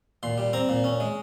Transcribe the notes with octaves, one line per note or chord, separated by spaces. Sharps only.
A#2 C6
G3
C4 A#5
A#2
C#4
G#3